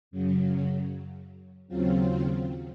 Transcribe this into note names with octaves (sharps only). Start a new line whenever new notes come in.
F#2 C#3 F#3
D#2 C#3 F#3 C4 F4